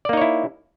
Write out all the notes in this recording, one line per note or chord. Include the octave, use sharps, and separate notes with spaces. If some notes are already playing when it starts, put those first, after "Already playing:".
A#3 D#4 E4 C#5 D5